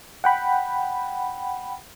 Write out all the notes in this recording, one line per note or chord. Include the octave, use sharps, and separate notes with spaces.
F#5 G5 B5